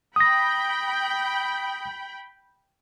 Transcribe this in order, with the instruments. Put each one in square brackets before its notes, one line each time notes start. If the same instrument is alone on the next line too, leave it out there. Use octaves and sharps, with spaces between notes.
[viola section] G5 B5 [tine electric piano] D#6 A#6